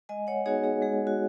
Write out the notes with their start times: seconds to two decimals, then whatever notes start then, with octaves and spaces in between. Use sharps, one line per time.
0.09 G#3 D#5 G#5
0.27 C#5 F#5
0.46 B3 D#4 F#4 G#4 C#5
0.64 G#4 C#5
0.82 G#3 G#4
1.07 F#4